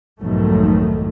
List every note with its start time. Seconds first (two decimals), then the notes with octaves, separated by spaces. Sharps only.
0.20 B1 F2 G#2 D#3 A3